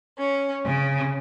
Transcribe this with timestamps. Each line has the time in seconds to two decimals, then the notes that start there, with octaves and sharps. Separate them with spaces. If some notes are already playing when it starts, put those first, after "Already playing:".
0.18 C#4
0.64 C#3